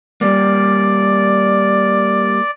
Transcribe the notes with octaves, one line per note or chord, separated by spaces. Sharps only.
G3 A#3 D5